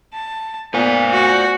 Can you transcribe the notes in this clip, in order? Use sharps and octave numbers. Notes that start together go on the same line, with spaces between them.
A5
A#2 B3 C5 G#5
F#4